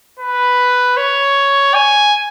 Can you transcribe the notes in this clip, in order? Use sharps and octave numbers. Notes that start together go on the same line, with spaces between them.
B4
C#5
G#5